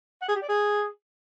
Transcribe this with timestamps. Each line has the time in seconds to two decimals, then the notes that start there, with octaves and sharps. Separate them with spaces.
0.22 F#5
0.29 G#4
0.35 G4
0.42 D5
0.49 G#4